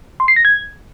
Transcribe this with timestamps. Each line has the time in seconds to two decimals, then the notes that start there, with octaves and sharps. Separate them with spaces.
0.20 C6
0.28 C7
0.36 A#6
0.45 G#6